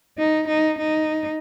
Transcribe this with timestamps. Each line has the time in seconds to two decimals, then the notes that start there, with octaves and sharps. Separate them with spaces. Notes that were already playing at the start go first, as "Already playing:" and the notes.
0.18 D#4
0.48 D#4
0.79 D#4